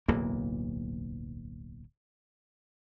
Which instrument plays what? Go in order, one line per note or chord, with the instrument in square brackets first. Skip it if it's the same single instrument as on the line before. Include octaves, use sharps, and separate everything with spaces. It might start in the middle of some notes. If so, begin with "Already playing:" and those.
[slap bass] D1 B1 E2 A#3